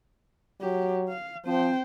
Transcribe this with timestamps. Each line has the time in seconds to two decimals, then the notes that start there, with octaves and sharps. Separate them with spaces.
0.61 F#3 G4
1.09 F5
1.46 F3 C4 C5 G5